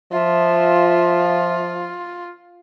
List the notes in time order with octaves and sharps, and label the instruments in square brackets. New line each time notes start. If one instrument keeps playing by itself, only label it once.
[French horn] F3 [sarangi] F4 [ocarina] E5